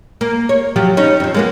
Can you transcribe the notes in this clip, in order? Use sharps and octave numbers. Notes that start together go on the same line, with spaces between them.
A#3
C#5
F3 F#3 G4
C#4 D#4
F2 F3
G#3 A#3 B3